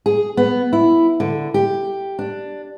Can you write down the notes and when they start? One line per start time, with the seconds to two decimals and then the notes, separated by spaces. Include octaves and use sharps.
0.06 G#4
0.37 B3
0.73 E4
1.20 D3
1.54 G4
2.19 D4